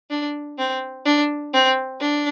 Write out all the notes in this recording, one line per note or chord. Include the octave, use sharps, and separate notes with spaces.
D4
C4
D4
C4
D4